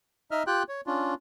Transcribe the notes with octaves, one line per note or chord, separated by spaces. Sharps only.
D#4 D#5 E5 F6
F4 G4 G5 F#6
C#5
C#4 D4 F4